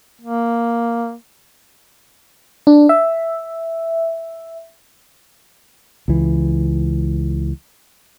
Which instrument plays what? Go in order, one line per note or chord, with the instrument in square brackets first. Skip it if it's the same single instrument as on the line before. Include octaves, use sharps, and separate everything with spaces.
[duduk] A#3
[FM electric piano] D4
E5
[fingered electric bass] C#2 E3